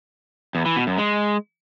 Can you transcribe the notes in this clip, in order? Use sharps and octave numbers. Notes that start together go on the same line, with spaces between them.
E2
E3
B2
F#2
G#3